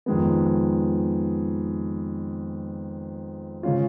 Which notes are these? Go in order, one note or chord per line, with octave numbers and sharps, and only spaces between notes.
F2 D#3 G#3 B3
C#3 G#3 C#4 F4